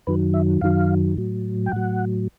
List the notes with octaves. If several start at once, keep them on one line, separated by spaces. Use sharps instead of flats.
F#2 D#3 F#3 B4
E5
F#2 D#3 F#3 F5
A2 F#3
G5
A2 F#3 F#5